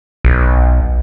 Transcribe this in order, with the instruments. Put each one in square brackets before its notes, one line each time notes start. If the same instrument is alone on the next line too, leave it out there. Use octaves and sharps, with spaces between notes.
[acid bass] B1